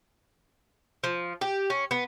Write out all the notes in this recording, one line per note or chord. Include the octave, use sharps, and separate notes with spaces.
F3
G4
C#4
B3